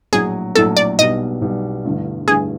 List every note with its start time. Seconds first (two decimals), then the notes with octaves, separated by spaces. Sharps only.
0.13 A#1 A2 F#3 G#4
0.55 A#1 A2 F#3 A4
0.77 D5
0.99 B1 B2 G3 D#5
1.42 B1 B2 G3
1.85 A1 G2 D3
2.27 A1 G2 D3 G#4